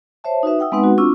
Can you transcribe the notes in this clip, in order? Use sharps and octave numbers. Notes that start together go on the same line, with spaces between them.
C5 C#5 E5 A5
D#4 F#4 B4 E5
E5 F#5 G5 D#6 E6
G#3 B3 C4 D#4 B4 F#5
F#4
C4 D4 F4 C#6 E6